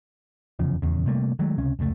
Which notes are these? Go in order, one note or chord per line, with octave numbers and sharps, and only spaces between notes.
F1 E2 C#3 F3
D#1 E2 C#3
C3 G3 A3 A#3
D#3 F#3 G#3 A3
C#2 C3 C#4
F1 C#2 B2 A3